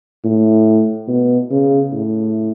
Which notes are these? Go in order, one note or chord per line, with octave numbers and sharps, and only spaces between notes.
A2
B2
C#3
A2